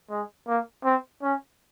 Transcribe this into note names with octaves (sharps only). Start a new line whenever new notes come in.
G#3
A#3
C4
C#4